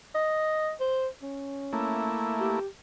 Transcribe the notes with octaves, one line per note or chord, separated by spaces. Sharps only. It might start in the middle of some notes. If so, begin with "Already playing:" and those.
D#5
C5
C#4
A3 A#3 E4
G4